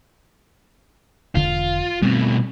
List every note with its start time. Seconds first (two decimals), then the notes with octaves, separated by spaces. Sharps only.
1.35 E1 D3 F4
2.02 B2 G3 A3 C4